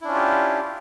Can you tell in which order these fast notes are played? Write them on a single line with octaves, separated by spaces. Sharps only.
E4 D4 C#4 F4 G4